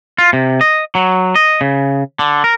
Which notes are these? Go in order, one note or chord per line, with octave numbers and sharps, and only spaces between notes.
F4
C3
D#5
F#3
D#5
C#3
D3
A#4